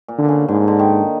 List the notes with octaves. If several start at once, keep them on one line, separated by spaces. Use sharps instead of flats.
A#2
D3
C#3
G#2 D3
D3
D#3